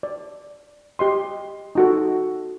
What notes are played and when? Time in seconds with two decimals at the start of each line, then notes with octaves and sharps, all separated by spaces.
0.03 D5
0.99 G4 D#5 C6
1.75 D#4 F#4 A4